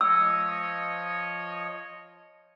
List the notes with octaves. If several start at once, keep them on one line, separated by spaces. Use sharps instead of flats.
F3 C#5 D#5 E6